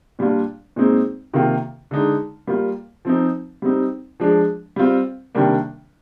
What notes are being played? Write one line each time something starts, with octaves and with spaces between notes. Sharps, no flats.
A#2 G3 D4 F4
A#2 G#3 C4 D#4
C3 D#3 A#3 F4
D3 G#3 D#4
G3 A#3 F4
F3 C4 D#4
G3 C4 D#4
F3 G#3 D4
G3 C4 F4
C3 D#3 G3 A#3 D4